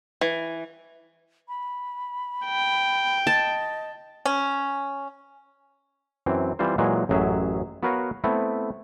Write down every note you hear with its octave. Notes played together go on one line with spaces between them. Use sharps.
E3
B5
G5
D#5 A5
C#4
F#2 E3 C4
E3 G3 C4 F4 C5
A#2 E3 F#3 G#3
A1 F#2 F#3 G#4 E5
B3 F#4 A#4 B4 C#5 F5
A3 B3 C4 E4